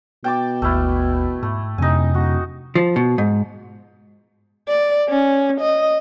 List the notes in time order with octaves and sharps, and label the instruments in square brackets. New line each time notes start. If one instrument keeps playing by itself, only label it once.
[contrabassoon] B2 [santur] G5 A5 D6
[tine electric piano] G#1 D#2 F6 [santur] A3 E4
[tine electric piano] G#2 [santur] A3
[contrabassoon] D1 [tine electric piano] F2 C3 [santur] D#4 G#5
[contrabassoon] D1 [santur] F#4
[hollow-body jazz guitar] F3
B2
G#2
[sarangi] D5
C#4
D#5